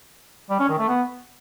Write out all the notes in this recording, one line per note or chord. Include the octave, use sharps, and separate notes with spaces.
G3
C#4
D#3
A3
B3